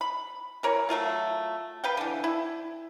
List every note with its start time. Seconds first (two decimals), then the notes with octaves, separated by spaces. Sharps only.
0.01 B5
0.63 E3 A#4 C#5
0.89 F#3 A3 F4 F5
1.84 B4 F5 G5
1.97 D3 E3
2.24 E4